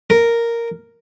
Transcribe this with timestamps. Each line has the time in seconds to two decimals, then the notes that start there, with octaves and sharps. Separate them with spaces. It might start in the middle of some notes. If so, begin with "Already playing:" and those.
0.10 A#4